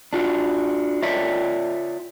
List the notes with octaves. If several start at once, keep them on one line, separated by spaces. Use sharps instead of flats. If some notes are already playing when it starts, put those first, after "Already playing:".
D4 F4 F#4
F4 C#5 D5 E5